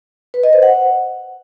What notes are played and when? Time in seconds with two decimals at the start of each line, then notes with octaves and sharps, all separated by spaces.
0.34 B4
0.43 D#5
0.53 C5
0.63 F#5